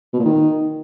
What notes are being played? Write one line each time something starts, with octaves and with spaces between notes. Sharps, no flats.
B2
A#2
D#3